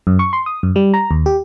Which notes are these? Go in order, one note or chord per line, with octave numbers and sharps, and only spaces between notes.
F#2
C#6
C6
D#6
F#2
G3
A#5
D#2
G4